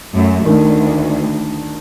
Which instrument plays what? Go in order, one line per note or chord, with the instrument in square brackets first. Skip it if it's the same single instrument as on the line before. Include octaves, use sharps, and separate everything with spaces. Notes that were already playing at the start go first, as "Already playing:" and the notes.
[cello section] F#2 A3
[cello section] D2 [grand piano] D#3 D4